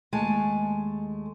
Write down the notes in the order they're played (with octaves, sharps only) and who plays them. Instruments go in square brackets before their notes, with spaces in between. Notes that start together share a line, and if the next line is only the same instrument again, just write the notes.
[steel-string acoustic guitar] D#2 G#3 A3 G#5 A5